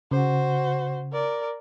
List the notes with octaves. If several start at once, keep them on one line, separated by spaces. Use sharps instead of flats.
C#3 F#4 C5
A#4 D5